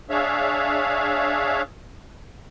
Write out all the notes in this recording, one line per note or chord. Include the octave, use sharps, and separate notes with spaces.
D4 G#4 C#5 E5 F5